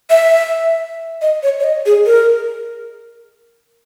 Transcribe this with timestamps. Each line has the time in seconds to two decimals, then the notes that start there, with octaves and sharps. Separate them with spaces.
0.10 E5
1.22 D#5
1.43 C#5
1.60 C#5
1.64 D#5
1.86 G#4
2.06 A#4